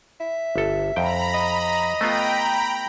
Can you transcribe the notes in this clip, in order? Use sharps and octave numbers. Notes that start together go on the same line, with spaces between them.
E5
G1 A4
F2 G5 A#5 B5
D#5
A3 B3 F4 G5 A#5 B5